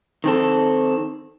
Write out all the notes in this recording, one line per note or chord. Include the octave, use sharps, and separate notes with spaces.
D#3 C4 A4